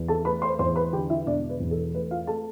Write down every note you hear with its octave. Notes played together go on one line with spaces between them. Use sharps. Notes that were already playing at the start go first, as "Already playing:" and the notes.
Already playing: E2
A4 A5
A3 B4 B5
C5 C6
E2 C5 C6
B4 B5
D3 G4 G5
E4 E5
E1 D4 D5
B4
E2
A4
A3 B4
F4 F5
A3 A4 A5